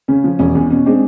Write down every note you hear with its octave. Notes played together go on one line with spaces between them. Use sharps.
C#3 C#4
F3
E1 C#4
E2 C#4
B2 C#4
G#3 C4 D4